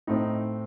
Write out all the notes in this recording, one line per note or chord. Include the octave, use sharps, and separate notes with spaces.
A2 A3 C4 D#4